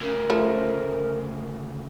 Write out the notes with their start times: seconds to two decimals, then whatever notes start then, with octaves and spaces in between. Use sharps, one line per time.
0.01 D2 C#3 A#4
0.30 F3 A3